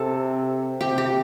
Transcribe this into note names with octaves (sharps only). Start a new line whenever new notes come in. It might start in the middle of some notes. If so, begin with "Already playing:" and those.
Already playing: C3 A4
C3 G4
G4